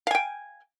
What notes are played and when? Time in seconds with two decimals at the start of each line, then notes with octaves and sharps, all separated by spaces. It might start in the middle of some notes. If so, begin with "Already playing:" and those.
0.07 F5
0.11 G#5
0.15 G5